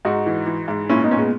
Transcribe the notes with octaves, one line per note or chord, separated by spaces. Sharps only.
G#2 D#4 F#4
E3
E3
G#2
A#2 C#4 E4
B3 D#4
A#2 C#4
G#3 B3